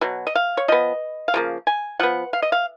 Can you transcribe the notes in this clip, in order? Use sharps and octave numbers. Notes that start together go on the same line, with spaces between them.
B2 F#3
D#5
F5
C#5
F3 B3 D#5
F5
C#3 F3 A#3
G#5
F3 B3 F#5
F5
D#5
F5